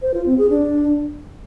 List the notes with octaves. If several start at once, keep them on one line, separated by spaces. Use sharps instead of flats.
C5
F4
C4
G#4
D4